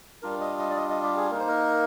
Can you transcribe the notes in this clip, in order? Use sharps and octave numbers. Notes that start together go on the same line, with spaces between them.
G3 D4 F4 A#4
D#5
D#5
D5
D#5
D#5
G4
G#4
A#3 D#4 A#4
C5
A#4